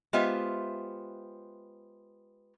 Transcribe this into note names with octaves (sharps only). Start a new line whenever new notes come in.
G#3 B3 F4 G4 C5 E5